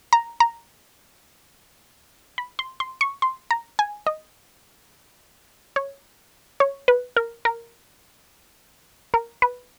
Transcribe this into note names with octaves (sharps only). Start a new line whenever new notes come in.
A#5
A#5
B5
C6
C6
C#6
C6
A#5
G#5
D#5
C#5
C#5
B4
A#4
A#4
A#4
B4